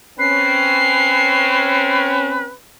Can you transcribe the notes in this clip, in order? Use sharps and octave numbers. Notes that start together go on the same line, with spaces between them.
C4 C#4 B4 C7